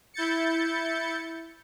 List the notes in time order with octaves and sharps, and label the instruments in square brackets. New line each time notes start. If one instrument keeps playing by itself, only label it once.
[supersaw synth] E4 G6 A6 C#7